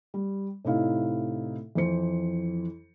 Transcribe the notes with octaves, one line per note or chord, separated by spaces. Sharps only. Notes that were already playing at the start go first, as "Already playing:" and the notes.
G3
A2 C3 D#4 E4 F5
F2 E3 C5 C#7